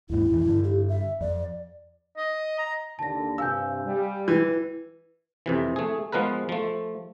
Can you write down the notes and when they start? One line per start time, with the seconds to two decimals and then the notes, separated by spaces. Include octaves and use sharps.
0.10 D#2 G#2 E4
0.30 F2 A2 E3
0.46 G2 D3
0.64 G4
0.89 E5
1.21 F2 D5
2.17 D#5
2.59 A#5
2.99 D#2 D3 A5 A#6
3.38 G2 C3 F5 G#5 E6 G6
3.86 G3
4.28 E3 B4
5.46 F2 C3 E3
5.76 A3 G#4
6.12 F3 G#3 B3 A#4 B4
6.49 F3 A3